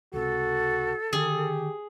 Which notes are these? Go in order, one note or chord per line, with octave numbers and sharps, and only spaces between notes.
C#2 C3 F#4 A4
D3 D#3 G4 G#4